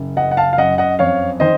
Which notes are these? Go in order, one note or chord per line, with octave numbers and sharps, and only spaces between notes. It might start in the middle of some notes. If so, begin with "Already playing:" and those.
Already playing: F#1
F#2 D#5 F#5
F#5
F5 A5
F5
F#2 D#5 F#5
D#5 F#5
F2 C#5 F5
D#3 C5 D#5